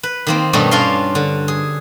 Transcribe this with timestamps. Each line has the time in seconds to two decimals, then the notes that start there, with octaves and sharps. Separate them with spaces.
0.03 B4
0.27 D#3 A#3 C4
0.53 G2 B2 G3 A3 C#4
0.71 C#4 D4 F4 A#4 F5 C6
1.15 D3
1.48 G#4